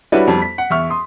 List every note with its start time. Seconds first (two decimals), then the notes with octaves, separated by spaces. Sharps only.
0.12 G3 D4 E4 F#4 B4 C#5
0.27 F2 G3 B3
0.42 B6
0.58 F#5
0.70 E2 E5 C#6 F6
0.90 C6 D#6